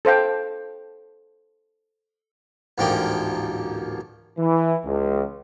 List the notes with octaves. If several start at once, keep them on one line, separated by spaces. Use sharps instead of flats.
A4 C5 F5 G5
A1 D2 G#2 F3 A#3 G5
E3
C#2